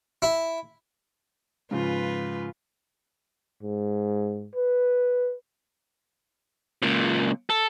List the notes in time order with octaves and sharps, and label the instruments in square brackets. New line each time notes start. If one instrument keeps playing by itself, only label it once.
[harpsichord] E4
[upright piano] G#2 C#3 F3 [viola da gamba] F4 B4
[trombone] G#2
B4
[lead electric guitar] C#2 A#2
A4